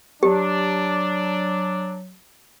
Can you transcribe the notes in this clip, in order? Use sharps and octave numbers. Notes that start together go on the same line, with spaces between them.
F#3 D4 G4